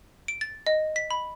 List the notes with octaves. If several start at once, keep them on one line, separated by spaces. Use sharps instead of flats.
D7
A6
D#5
B6
B5